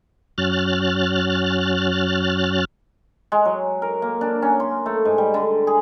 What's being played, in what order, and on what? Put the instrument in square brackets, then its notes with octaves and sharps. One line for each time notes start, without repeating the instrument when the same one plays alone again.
[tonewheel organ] F#2 F#3 C#4 F6 F#6 A6
[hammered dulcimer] G#3
F#3
A#4
A#3
D4
C#4
C6
A3
G#2
G3
D3
G#4